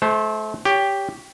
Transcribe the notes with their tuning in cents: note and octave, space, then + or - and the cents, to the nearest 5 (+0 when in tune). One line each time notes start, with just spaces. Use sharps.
A3 -30 C5 +0
G4 +5 C#5 +25